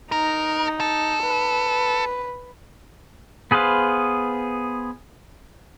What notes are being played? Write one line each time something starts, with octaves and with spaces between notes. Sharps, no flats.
D#4 A#4
A4
B4
B3 G#4 B4 C5 F5